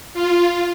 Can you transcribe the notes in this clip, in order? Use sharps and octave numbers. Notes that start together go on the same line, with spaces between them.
F4